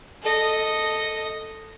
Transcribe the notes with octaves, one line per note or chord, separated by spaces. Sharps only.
A4 D#5